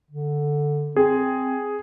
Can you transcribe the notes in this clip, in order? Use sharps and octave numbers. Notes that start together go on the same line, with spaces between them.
D3
C4 G#4